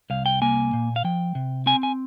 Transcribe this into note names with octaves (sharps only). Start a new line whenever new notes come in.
C2 F5
G5
A#3 G#5
A#2
F5
F3 G5
C3
C4 G#5
G#5